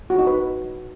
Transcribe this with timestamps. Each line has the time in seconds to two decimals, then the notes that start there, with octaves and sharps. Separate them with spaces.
0.10 F#4
0.19 D#4
0.27 B4